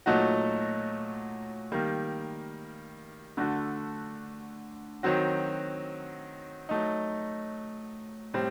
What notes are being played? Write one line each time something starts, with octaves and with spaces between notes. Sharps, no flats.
A#2 F#3 A3 D#4 F#4
D#3 G3 A#3
D3 A3 D4 F#4
D#3 F#3 C4 F#4
F#3 A3 D#4
A2 G3 C4